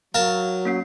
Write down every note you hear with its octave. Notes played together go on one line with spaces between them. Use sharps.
F#3 A#4 F5 A5
A#3 C#4 C7